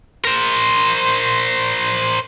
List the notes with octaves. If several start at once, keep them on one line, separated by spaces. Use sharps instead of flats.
A#4 C5